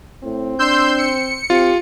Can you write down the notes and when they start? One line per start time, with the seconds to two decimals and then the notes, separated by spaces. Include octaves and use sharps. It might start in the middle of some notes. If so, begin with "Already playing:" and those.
0.24 A2 C4
0.59 D4 C6 E6 G6
0.98 C#7
1.50 C4 F4 G4